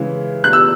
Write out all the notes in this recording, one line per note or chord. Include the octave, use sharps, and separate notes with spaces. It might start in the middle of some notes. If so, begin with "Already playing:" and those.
Already playing: C#3 E3 G#3
F#6
E6